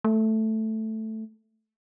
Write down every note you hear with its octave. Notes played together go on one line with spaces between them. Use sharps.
A3